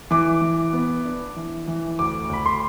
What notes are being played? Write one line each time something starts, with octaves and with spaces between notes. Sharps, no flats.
E3 D6
E3
B3
D4
E3
E3
D2 D6
D2 B5
C6